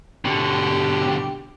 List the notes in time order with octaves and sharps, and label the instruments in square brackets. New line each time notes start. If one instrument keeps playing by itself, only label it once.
[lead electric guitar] B2 D3 [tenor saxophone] G4